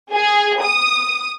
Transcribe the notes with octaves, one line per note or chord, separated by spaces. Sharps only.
G#4
D#6